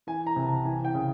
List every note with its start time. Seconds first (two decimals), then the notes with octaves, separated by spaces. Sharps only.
0.07 E3 G#5
0.27 A#5
0.36 C3
0.46 A5
0.65 E3 G#5
0.85 G5
0.94 C#3